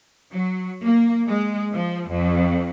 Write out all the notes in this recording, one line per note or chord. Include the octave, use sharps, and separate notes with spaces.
F#3
A#3
G#3
F3
F2